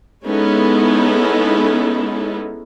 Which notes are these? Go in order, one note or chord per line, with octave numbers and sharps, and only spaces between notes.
G#3 B3 C#4 D#4 E4 A4